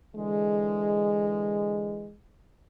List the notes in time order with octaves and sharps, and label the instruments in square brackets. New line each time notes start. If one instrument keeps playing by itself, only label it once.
[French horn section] D3 E3 G#3